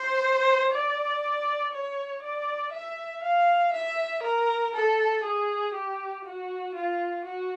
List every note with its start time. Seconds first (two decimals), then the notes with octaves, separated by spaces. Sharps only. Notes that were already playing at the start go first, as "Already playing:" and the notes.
Already playing: C5
0.72 D5
1.72 C#5
2.22 D5
2.72 E5
3.23 F5
3.73 E5
4.23 A#4
4.74 A4
5.24 G#4
5.73 G4
6.25 F#4
6.75 F4
7.25 F#4